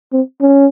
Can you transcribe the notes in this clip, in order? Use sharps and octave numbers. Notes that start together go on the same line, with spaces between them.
C4
C#4